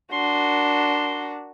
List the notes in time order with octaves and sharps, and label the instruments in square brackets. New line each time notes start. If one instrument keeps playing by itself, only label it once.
[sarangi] D4 [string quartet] F#4 A#4 [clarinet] C6